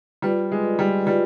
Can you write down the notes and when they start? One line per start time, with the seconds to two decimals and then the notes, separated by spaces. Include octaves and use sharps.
0.22 G3 F4 B4 D5
0.52 G#3
0.79 G3
1.07 G3 F4 B4 D5